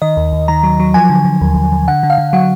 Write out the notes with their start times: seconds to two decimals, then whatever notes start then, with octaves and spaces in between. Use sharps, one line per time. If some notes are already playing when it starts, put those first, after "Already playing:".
0.02 D#3 D#5
0.17 D#2
0.33 D#2
0.48 D#3 A#5
0.63 F#3
0.80 F#3
0.94 F3 G#5
1.10 D3
1.25 D3
1.41 D#2
1.56 D#2
1.72 D#2
1.88 D3 F#5
2.03 D3
2.10 F5
2.18 D3
2.33 F#3 F#5